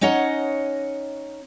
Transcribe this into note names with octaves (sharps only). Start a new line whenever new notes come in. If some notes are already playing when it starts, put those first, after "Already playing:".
C#4 D#4 C#5 D#5 F#5